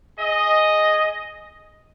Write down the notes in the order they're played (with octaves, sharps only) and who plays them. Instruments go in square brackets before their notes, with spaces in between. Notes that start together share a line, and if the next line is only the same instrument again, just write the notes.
[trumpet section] G#4 D#5